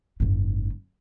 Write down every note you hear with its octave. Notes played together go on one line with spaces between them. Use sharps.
F#1 G#2